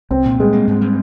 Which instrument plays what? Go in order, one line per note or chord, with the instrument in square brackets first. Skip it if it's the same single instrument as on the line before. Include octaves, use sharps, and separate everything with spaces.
[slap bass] C2 [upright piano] C4
[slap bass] A#2
[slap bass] G3 [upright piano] G#3
[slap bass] A#3
G#2
G3